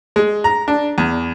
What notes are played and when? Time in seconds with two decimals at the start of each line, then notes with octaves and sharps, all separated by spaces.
0.16 G#3
0.44 A#5
0.68 D4
0.98 E2